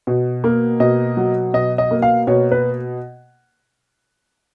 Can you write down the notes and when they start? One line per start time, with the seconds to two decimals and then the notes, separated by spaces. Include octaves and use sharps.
0.07 B2
0.44 A#3
0.80 B2 D#5
1.17 F#3
1.54 B2 D#5
1.78 D#5
1.91 A#3
2.02 F5
2.27 B2 C#5
2.52 B4